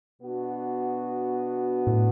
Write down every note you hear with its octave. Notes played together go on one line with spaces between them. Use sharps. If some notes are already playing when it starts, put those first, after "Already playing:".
B2 B3 D4 F#4
A2